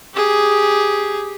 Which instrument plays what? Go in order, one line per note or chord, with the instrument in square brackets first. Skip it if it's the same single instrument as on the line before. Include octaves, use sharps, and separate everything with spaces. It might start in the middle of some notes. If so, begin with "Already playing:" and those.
[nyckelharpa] G4 G#4